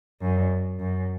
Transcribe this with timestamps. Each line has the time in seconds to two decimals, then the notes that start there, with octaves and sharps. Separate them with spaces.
0.21 F#2
0.79 F#2